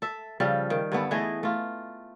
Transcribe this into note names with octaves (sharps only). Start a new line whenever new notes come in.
A4 E5
C#3 F3 G3 A4
D#3
G2 D3 B3 A4
E3 A3 G#4 D#5
A3 F4